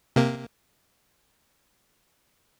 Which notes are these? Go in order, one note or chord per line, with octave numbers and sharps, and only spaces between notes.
C3 A#3